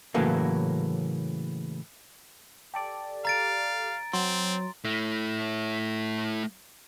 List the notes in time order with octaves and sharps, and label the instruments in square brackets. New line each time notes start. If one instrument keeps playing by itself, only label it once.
[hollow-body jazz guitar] A2 C#3 E3 F#3 A3 A#3
[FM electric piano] G4 A4 D5
[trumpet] F5 [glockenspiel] A#5 A6 D7
[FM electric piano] F#3 [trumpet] C4 [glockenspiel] C6
[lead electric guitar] A3 E4